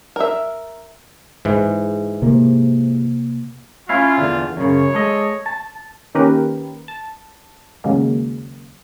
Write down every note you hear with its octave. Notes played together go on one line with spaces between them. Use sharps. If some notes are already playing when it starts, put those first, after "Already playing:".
A#4 E5
G#2 E3
C3 A#3
C#4 E4 F4 F5
E2 D3
F#2 C#3 C#5
G#3 A4 D#5
A5
D#3 A#3 C#4 G4 A#4 B4
A5
D#2 C#3 F#3 G#3 A#3